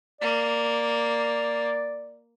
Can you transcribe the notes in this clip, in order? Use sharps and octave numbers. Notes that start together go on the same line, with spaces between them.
A#3 D5